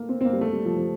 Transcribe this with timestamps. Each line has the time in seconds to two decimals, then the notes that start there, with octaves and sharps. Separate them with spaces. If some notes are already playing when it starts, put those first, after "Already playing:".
Already playing: A3 A#3
0.09 C4
0.21 C4
0.25 A#3
0.33 G3
0.41 A3
0.53 G3
0.65 F3
0.76 F3